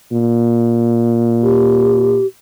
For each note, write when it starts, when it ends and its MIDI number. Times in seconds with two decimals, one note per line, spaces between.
0.12 2.19 46
1.43 2.26 67